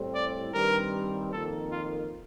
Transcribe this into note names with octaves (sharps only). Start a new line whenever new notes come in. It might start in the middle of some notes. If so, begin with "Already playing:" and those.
Already playing: A2 G3 C4
D5
G2 D#3 G3 C4 A#4
F2 D#3 A#3 A4
F4